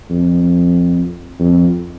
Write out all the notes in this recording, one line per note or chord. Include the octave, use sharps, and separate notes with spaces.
F2
F2